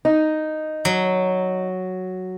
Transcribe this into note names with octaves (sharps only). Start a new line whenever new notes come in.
D#4
F#3